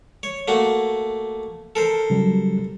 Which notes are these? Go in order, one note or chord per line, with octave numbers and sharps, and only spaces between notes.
C#5
A3 A#3 F#4
A4 A#4 C5
C#3 F#3 G3